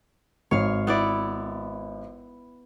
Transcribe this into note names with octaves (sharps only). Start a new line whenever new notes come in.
G#1 C#5 F5
B3 E4 D5